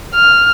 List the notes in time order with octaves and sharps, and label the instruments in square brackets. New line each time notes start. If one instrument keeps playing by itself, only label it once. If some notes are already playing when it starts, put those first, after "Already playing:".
[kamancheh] F6